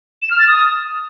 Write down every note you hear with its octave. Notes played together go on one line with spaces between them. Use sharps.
E7
F6
A6
D#6